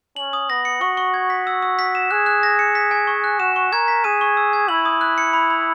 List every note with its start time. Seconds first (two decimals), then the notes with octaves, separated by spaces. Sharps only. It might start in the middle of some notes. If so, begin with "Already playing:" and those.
0.16 C#4 F#7
0.33 D#6
0.50 B3 A#6
0.65 C#7
0.81 F#4 C#6
0.97 C#6
1.14 G#6
1.30 B6
1.47 E6
1.62 E6
1.79 B6
1.95 E7
2.10 G#4 F#6
2.26 F#6
2.43 A#6
2.59 C#7
2.75 B6
2.91 G#5
3.07 C#6
3.24 F#6
3.40 F#4 E7
3.56 C#6
3.73 A#4 G#6
3.88 B6
4.04 G#4 D#7
4.21 C#6
4.37 E6
4.53 G#6
4.68 E4 F#7
4.85 D#6
5.01 F#6
5.18 C#7
5.33 B5
5.50 B5